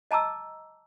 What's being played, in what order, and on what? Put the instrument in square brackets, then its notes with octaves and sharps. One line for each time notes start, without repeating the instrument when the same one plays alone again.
[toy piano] D#5 A5 A#5 D6 E6